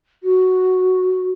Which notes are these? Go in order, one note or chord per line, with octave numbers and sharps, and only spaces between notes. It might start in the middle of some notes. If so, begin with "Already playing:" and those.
F#4